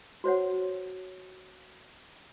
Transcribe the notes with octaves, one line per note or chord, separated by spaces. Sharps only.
F#4 C5 C#5 F#5